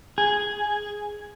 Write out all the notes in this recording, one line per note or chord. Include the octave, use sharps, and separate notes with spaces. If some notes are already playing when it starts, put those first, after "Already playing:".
G#4